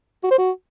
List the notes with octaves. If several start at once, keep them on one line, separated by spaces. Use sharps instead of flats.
F#4
C5
F#4